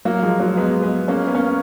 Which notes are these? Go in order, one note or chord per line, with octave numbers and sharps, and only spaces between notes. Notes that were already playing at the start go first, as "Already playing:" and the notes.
F#3 A#3
F3 G#3
F#3 A#3
G#3 B3
G#3 B3
A#3 C#4
B3
A#3 C#4